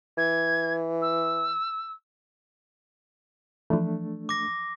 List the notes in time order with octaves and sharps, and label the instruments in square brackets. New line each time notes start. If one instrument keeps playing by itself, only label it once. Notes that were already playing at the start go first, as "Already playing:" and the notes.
[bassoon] E3 [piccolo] G#6
[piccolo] E6
[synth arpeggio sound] E3 F3 [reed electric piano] A3 D4
[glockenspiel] D6 A#6